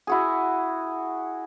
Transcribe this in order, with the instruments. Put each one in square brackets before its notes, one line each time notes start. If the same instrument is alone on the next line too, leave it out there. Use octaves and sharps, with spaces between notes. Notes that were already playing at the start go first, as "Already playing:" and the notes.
[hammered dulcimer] E4 F#4 G#4